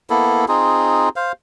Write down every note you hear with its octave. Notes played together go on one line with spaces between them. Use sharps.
A#3 B3 E4 A4
C4 D#4 F4 G#4
C5 F5